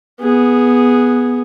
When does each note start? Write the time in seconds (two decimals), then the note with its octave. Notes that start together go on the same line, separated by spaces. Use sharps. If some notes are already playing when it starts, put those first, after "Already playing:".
0.20 B3 G#4